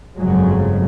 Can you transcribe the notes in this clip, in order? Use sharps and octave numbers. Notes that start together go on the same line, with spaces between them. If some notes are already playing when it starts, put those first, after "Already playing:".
G1 F2 C#3 F#3 G#3